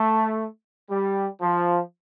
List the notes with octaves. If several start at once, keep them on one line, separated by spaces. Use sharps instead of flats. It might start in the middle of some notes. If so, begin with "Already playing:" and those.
Already playing: A3
G3
F3